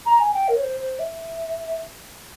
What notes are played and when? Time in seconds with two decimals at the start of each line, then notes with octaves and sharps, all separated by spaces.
0.05 A#5
0.20 G#5
0.34 G5
0.48 A#4
0.56 C#5
0.61 C5
0.80 C5
0.99 E5